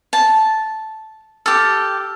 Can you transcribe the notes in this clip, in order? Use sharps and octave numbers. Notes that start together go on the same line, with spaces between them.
A5
G4 A4 E6 F6